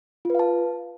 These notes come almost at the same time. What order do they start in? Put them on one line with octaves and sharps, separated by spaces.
F4 B4 F5 A5